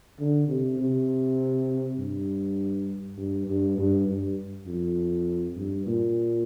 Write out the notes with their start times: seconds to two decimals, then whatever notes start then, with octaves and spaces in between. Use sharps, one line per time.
0.19 D3
0.49 C3
0.80 C3
1.99 G2
3.18 G2
3.48 G2
3.78 G2
4.07 G2
4.67 F2
5.56 G2
5.87 A#2